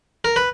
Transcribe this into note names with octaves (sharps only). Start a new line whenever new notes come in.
A#4
B4